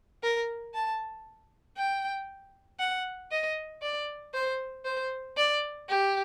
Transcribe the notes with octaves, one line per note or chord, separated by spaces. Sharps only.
A#4
A5
G5
F#5
D#5
D5
C5
C5
D5
G4